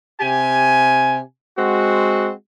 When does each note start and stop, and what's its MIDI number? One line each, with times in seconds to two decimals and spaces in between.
0.21 1.20 48
0.21 1.20 67
0.21 1.20 80
1.58 2.31 56
1.58 2.31 60
1.58 2.31 66